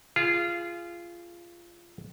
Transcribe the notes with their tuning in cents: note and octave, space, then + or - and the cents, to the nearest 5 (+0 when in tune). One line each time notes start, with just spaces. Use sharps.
F4 -20 G#4 +0